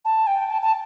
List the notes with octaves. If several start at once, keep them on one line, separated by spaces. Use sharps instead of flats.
A5
G5
A5
A5